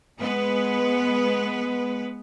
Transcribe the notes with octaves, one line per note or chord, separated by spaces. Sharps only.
G#3 B3 B4